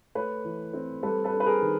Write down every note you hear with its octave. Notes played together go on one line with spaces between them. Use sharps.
A3 B4 C#5
E3
C4
G3 A4 B4
A4 B4
D4
B4
G#4 A#4
D#3